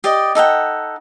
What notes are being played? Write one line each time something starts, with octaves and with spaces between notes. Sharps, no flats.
G4 D5 D#5
D#4 A4 F#5 G5